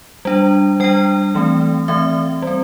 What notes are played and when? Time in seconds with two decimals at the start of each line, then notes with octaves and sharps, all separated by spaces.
0.25 G3 D4
0.80 G3 D4 G5
1.35 E3 A3 C4
1.88 E3 A3 C4 E5
2.42 G3 C4